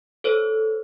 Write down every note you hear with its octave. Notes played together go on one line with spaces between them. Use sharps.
A4 C5 C#5